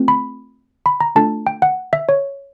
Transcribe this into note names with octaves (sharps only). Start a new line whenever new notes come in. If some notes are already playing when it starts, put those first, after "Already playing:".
Already playing: A3 C4 F4 A4
B5
B5
A#5
A3 D4 F4 A4 A5
G5
F#5
E5
C#5